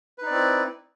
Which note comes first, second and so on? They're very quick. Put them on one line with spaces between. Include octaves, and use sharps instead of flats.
B4 D#4 D5 C4 E4